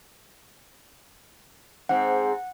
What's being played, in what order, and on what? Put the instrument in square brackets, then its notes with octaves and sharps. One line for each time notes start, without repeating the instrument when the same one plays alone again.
[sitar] G#2 C4 [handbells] F#5